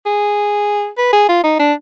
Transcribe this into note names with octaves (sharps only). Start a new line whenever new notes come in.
G#4
B4
G#4
F4
D#4
D4